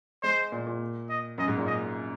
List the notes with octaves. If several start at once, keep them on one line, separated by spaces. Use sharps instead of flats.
G#3 C5
A#2
A#2
D#5
F#2 D#5
G#2
A#2
D#5